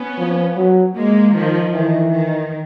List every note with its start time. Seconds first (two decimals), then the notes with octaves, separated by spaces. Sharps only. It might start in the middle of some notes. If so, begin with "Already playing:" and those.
Already playing: B3 C#4
0.18 F3
0.57 F#3
0.96 G#3 A#3
1.34 D#3 F3
1.73 D#3 E3
2.11 D#3